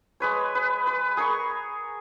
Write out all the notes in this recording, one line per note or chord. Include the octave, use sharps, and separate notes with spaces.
G#3 B4 C#5
B4
B4
G#4 A#4 C#6